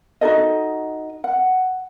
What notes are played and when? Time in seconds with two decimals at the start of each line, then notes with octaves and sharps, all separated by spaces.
0.21 D#4 F#4 A4 D#5
1.24 F#5